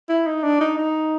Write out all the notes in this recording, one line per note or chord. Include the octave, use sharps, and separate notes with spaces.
E4
D#4
D4
D#4
D#4